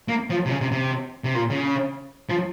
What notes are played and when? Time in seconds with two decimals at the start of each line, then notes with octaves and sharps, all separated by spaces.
0.08 A#3
0.30 F3
0.46 C3
0.51 C#3
0.61 C3
0.72 C3
1.24 C3
1.35 A#2
1.50 C#3
2.29 F3